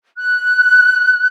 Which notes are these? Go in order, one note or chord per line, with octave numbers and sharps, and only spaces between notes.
F#6